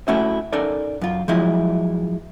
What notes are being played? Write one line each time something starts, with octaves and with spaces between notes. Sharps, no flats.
A3 C#4 E4 F#4 E5
C#4 D#4 A4 A#4 D5
F#2 F4
F3 F#3 G#3 E4